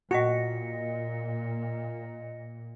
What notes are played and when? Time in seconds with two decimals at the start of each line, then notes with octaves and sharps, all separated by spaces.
0.11 A#2 F#4 D#5 A#6 C#7